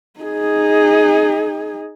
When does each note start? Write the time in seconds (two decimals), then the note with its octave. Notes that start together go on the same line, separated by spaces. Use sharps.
0.20 D#4 G#4